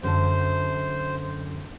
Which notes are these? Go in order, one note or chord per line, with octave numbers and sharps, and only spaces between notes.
F#2 D3 C5 A5